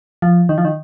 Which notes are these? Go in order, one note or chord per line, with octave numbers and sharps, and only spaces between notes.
F3
D#3
F3
D#3